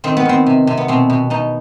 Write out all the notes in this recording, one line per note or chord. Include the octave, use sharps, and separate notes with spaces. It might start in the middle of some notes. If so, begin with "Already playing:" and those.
D#3 C4
B3
D#3 C4
C3
C3
B3
B2 C4
B2
B2 D#4